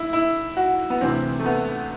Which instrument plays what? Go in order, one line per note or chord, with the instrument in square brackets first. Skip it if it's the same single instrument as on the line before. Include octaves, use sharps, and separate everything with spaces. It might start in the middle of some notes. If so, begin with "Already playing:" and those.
Already playing: [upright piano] E4
E4
F#4
B3
D2 C3 E3 C4
A3
B3